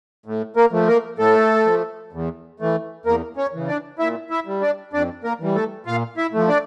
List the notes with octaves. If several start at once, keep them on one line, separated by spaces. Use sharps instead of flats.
A2
A#3 A#4
F3 A3
A#3 A#4
A2 A3 A4
F3 A3
E2
E3 A3
E2 A#3 A#4
C#4 C#5
C#3 E3
D4 D5
A#2 E4 E5
E4 E5
G3
D4 D5
F2 D4 D5
A#3 A#4
E3 G3
A3 A4
A#2 F4 F5
E4 E5
F3 A3
D4 D5